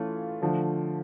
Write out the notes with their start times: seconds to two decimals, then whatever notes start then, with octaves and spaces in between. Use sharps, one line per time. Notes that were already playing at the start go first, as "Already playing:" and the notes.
Already playing: E3 A3 C#4 F4
0.42 D3 F3 A3